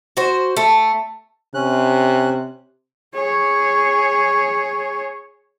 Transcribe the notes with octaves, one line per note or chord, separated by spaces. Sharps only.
F#4 C5
A3
C3 C#4 F#6
G#4 C#5